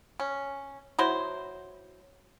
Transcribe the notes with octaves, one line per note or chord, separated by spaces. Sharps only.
C#4
F#3 E4 C5